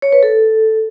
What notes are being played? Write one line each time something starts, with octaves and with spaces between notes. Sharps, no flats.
C#5
B4
A4